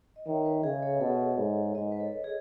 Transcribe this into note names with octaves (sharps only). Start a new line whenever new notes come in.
D#5
D#3 C#5 E5
B4 D#5
C#3 G#4 B4
A4 C#5
B2 A4 C#5
G#2
G#2 B4 D#5
B4
A4 C#5
G#4 B4